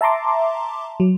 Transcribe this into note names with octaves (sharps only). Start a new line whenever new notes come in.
E5 A5 A#5 C6 D6
F#3